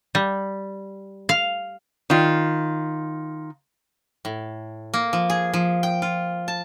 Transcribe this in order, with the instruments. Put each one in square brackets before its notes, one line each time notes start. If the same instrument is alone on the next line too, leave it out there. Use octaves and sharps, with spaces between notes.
[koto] G3
F5
[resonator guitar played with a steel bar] D#3 F4
[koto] A2
A#3
F3
G#4
F3
G5
F4
A5